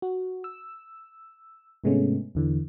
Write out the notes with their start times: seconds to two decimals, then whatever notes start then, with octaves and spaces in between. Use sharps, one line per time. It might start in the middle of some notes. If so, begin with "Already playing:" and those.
0.02 F#4
0.44 E6
1.84 G#2 C3 G#3 A3 B3 C#4
2.35 E2 D3 E3